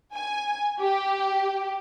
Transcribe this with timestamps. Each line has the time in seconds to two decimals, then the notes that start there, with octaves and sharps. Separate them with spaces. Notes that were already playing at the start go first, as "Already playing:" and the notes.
0.14 G#5
0.80 G4